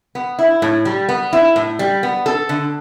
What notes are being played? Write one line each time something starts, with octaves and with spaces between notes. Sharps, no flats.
B3
E4
A2
G3
B3
E4
A2
G3
B3
A4
D3